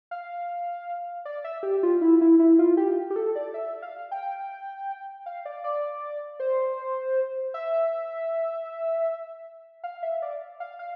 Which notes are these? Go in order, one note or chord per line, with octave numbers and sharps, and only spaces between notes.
F5
D5
E5
G4
F4
E4
E4
E4
F4
G4
G4
A4
D5
E5
F5
G5
F5
D5
D5
C5
E5
F5
E5
D5
F5
F5